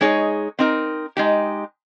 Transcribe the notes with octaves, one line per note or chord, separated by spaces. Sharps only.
G#3 D#4 G#4 C#5
C4 D#4 A#4
G#3 D#4 G4